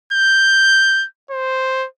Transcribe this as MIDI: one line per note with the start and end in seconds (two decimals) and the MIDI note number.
0.13 1.06 91
1.31 1.86 72